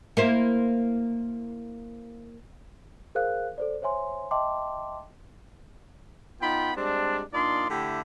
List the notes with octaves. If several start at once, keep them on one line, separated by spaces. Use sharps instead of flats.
A#3 E4 C5
G#4 A#4 C5 F5 F#6
A4 C5 D5
C5 C#5 E5 G#5 C6
D#5 E5 G5 A5 C6 D6
B3 D#4 F4 G5 B5
G3 G#3 C4 D4
A#2 D4 D#4 D5 C6
D3 A3 E4 G4